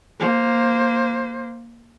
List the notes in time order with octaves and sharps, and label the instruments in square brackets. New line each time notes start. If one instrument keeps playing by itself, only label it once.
[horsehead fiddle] A#3 C5